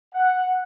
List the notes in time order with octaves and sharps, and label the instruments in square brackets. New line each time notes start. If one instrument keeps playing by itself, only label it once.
[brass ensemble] F#5